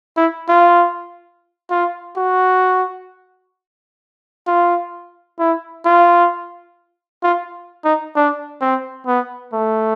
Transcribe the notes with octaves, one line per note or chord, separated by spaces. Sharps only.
E4
F4
F4
F#4
F4
E4
F4
F4
D#4
D4
C4
B3
A3